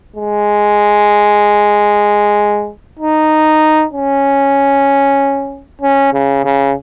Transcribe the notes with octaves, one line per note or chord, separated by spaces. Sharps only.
G#3
D#4
C#4
C#4
C#3
C#3